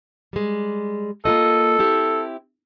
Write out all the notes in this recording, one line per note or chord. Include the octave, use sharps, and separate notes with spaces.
G3 G#3
A#3 F4 A4 D#5
C4 E4 G4